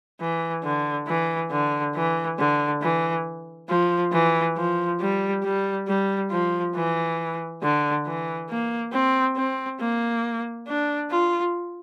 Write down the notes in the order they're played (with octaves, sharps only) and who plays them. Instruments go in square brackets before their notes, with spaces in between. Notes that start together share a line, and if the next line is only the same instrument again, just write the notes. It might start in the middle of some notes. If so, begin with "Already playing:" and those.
[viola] E3
D3
E3
D3
E3
D3
E3
F3
E3
F3
G3
G3
G3
F3
E3
D3
E3
A#3
C4
C4
A#3
D4
F4